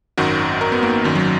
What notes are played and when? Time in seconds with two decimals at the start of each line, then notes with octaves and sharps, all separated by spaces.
0.18 G#1 F#2 D#3 F#4
0.61 A#4
0.72 B3
0.83 A#3
1.04 G#1 F#2 D#3
1.15 F#3